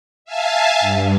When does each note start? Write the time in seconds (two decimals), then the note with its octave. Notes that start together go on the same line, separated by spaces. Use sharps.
0.25 E5 F5 G#5 A5
0.80 G2